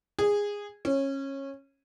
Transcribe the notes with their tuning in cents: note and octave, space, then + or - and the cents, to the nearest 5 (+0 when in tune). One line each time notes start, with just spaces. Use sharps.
G#4 -15
C#4 -20